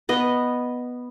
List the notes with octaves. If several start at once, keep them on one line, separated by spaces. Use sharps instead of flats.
B3 D#5